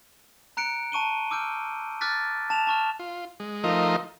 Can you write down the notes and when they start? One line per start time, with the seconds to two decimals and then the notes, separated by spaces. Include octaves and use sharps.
0.57 A#5 F#6 C#7 D7
0.92 A5 C#6 D#7 G7
1.31 D6 E6 F6 G6 D7
2.01 D6 F6 F#6 A6 B6
2.50 A5 E7 F7
2.67 A5 C#6 F6
2.99 F4
3.40 G#3
3.64 F3 A3 D#4 F4 A#4 D#5